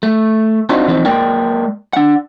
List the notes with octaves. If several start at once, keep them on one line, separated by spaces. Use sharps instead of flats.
A3
C4 D4 D#4 F4 F#4
E3 F3 C4 D4 D#4
G#3 A#3 A#4 D5 G5
D4 F#5